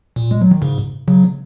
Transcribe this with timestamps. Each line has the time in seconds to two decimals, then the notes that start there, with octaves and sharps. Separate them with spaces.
0.16 A#2
0.31 G#3
0.42 F#3
0.51 D#3
0.62 G#2 C#3
1.08 C#3 F#3